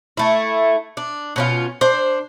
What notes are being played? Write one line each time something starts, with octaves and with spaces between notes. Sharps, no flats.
A3 E4
D4
B2 C#4 F4
D4 C5